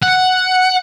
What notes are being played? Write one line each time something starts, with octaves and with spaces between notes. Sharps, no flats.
F#5